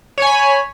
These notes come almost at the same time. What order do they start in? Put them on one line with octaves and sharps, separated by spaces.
C#5 G#5 B5